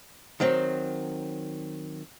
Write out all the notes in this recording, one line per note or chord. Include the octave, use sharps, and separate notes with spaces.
D#3 F#3 C4